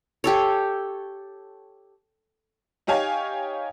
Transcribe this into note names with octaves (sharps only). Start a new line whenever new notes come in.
G4 A4 C#5
D#4 G4 C#5 F5 G#5 C#6